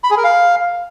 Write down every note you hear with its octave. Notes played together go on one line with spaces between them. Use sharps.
B5
G#4
A#4
F5